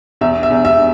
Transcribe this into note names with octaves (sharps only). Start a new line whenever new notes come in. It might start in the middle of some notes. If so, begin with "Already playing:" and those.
E2 E5
E5
E2
E5